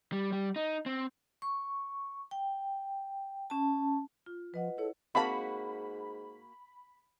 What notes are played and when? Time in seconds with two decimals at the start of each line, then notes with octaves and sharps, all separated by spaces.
0.12 G3
0.32 G3
0.56 D#4
0.86 C4
1.42 C#6
2.31 G5
3.50 C#4 A5
4.26 F4
4.54 F3 B4 D#5 F#5
4.78 E4 G#4 A4 C#5
5.15 G#2 A#3 C4 F#4 F5 A5 B5